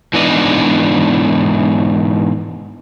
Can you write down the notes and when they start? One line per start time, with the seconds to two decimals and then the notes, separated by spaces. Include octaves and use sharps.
0.13 G#2 E3 B3 D4 D#5